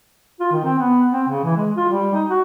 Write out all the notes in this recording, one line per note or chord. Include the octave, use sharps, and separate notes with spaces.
F4
D#3
C4
B3
C4
C#3
E3
G#3
F4
G3
D#4
F#4